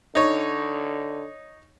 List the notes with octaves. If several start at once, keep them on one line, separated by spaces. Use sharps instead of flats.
D3 D#4 C#5